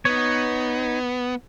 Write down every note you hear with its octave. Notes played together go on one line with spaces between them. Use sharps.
B3 D#4 C#5